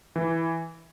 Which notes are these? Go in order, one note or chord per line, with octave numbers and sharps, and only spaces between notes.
E3